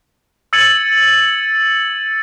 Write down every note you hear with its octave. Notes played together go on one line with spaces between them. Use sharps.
E6 G#6 A6 C#7 D#7 F#7